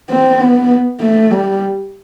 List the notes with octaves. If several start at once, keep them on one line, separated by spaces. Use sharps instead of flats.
C4
B3
A3
G3